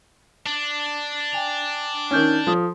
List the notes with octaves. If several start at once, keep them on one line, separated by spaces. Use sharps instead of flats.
D4
G5 G#5 F7
D#3 C#4 D#4 F6 G6
F3 A4 D#6